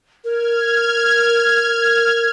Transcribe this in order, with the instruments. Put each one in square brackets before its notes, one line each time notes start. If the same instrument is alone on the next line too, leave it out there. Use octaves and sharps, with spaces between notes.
[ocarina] A#4 [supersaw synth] F6 G#6